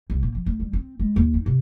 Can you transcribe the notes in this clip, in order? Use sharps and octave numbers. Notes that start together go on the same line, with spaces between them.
C2
A#2
F3
D2
G3
C4
G#3
D#2
D#4
C3